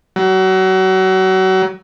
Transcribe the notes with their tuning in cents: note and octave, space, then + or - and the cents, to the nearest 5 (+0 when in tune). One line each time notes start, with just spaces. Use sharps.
F#3 +30